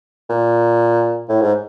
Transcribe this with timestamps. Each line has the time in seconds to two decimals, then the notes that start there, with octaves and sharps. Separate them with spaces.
0.30 A#2
1.29 A2
1.41 G#2